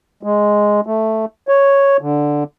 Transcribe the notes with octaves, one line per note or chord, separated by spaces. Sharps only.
G#3
A3
C#5
D3